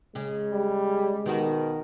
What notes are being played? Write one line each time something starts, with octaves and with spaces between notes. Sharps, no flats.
C#3 G#3
G3
B2 D#3 F#4